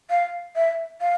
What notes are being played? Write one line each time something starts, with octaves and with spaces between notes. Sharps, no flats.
F5
E5
F5